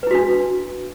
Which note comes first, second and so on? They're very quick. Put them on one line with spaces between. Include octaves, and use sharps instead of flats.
B4 E4 F#4 D4